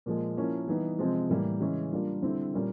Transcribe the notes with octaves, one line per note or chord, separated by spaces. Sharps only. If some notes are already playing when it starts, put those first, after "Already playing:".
A#2 F3 G#3
F3 A#3 C#4 E4
E3 G3 B3 D#4
C3 F3 G#3 C4
A2 E3 G3 A#3
C#3 E3 G#3 C#4
G3 A#3 D4 F4
D3 G3 C4 E4
A#2 G3 A#3 C#4 F4